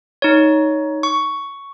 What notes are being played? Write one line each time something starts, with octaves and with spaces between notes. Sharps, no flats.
D#4 C#5
C#6